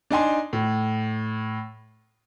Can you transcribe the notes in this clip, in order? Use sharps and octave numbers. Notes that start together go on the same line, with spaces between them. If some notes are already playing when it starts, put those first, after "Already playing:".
D4 D#4 G#5 C6
A2